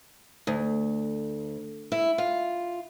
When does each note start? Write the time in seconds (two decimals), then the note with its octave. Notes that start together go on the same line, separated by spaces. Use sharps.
0.47 D2
1.92 E4
2.18 F4